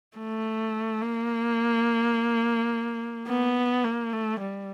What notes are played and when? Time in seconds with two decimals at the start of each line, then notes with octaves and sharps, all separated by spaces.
0.18 A3
1.02 A#3
3.28 B3
3.84 A#3
4.13 A3
4.41 G3